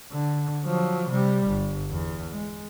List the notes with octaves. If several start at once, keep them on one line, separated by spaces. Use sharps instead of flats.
D3
F3 F#3
C3 G3
G1
E2
G#3